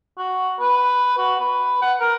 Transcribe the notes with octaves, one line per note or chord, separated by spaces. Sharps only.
F#4
B4
F#4
B4
F#5
A#4